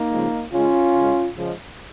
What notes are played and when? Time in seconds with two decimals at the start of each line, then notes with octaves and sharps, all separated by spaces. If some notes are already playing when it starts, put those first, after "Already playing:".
Already playing: A#3 D#4
0.11 C#3 F3 G#3
0.52 C#3 G#3 C#4 F4
0.95 C#3 G#3
1.36 C#3 F3 G#3